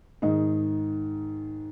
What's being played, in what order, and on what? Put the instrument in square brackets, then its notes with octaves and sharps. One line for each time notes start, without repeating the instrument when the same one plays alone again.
[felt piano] G#2 D#3 D#5